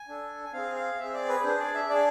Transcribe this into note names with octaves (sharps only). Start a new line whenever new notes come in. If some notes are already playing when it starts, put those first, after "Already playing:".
Already playing: G#5
D4 A4
G#5
C4 G#4 F5
F5
C4 G#4 E5
D5
B4
D4 G#4 C5
D5
E5
D4 G#4 D5